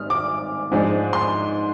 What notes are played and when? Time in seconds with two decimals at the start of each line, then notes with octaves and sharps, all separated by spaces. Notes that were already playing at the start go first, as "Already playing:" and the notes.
Already playing: G#1 G#2 G3 D#6 F6
0.10 D6
0.72 G#2 F3 G#3 D4
1.13 C6